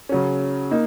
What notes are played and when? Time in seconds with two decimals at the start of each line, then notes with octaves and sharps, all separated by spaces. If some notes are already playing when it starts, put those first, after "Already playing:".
0.09 C#3 F#3 C#4
0.71 A#3 D#4